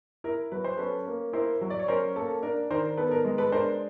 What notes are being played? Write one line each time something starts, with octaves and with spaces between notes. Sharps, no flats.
E4 A#4
F#3 B4
C5
C#4 A4 B4
A#3
E4 A#4 C5
F#3
D5
C#5
C#4 A#4 C5
A#3 A4
D4 A#4
D#3 A#4 C5
B3 A4 B4
A#4
G#3
A4 B4
D4 A#4 C5